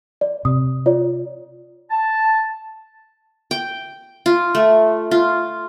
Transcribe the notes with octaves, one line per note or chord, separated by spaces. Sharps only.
D5
C3 D#6
F4 C#5 D5
A5
G5
F4
A3
F4